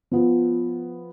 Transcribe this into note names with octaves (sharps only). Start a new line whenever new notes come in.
F3 B3 F4